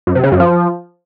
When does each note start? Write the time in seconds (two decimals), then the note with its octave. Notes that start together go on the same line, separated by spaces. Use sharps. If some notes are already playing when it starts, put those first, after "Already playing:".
0.07 F#2
0.15 C3
0.23 C#3
0.32 F#2
0.40 F3